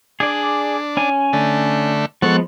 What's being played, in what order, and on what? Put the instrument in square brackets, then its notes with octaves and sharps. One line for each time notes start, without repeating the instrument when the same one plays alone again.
[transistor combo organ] D4 [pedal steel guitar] G#4 D5
[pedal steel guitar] C#4 G#5
[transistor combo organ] D3 A3
[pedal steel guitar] F3 G#3 B3 [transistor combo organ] A4 F#5 C#6